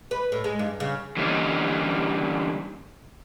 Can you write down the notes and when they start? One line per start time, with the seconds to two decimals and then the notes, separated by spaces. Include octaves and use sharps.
0.11 B4
0.32 A2
0.44 G#3
0.59 G2
0.80 C#3
1.17 D3 E3 G3 A#3 C#4 D#4